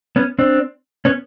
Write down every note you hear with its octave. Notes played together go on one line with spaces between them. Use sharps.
B3 C#4
C4 D4
B3 C#4